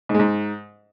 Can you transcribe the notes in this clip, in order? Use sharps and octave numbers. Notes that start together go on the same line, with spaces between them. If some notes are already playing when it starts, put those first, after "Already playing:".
G#2
G#3
G#2